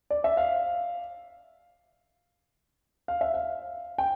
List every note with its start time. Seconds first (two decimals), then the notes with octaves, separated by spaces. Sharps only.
0.10 D5
0.24 E5
0.37 F5
3.08 F5
3.21 E5
3.34 F5
3.98 G5